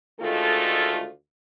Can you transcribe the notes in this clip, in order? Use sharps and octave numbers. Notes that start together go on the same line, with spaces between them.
D2 D#3 G#3 A3 F4 A4